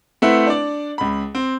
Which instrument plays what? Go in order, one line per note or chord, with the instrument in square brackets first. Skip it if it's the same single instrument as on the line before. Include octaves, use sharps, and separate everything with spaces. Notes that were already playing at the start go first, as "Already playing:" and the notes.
[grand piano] A3 C4 E4 B4 E5 F#5
D4 D5
C#2 B5
C4